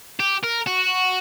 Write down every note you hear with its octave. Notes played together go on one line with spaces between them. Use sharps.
G4
A#4
F#4